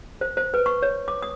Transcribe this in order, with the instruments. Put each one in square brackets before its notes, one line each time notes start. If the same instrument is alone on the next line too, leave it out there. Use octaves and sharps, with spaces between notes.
[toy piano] C5
C5
B4
C#6
C#5
D6
D#6